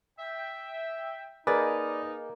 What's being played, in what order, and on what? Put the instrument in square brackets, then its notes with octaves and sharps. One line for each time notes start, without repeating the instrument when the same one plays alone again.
[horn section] E5 G5
[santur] A#3 [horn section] D#4 [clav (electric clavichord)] G#4 [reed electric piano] B4 D5 A6